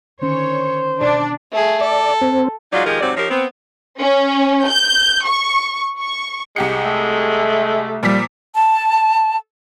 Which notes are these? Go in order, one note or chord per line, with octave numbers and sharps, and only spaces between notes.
D3 D#3 C#4 C5 C#5
B2 D4 D5
A3 G#4
A4 D5
C4
F#3 G#3 D#4 F4 F#4 D5
D#3 F3 G#3 G4 A#4
G#2 C3 F#3 C4 D5
F3 D#4 G4 A#4 C#5
B3 C4
C#4
G6
C#6
C#6
C2 G#3 G4 C#7
A3
A#2 F3 G3 B6
A5